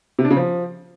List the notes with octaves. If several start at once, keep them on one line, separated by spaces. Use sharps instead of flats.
C3
D4
C#3
F3